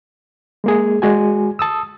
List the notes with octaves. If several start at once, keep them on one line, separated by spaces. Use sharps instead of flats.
G#3 A#3 G#4
G#3 F#4 G#5
A5 D#6 E6